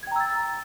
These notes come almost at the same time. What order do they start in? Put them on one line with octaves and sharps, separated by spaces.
G#6 G5 A#5 E6 A6